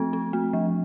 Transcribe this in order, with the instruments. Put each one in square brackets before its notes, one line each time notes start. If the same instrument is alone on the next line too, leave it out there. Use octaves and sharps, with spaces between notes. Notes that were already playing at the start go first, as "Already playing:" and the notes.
Already playing: [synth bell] F3 A3 C4
C4
A3
F3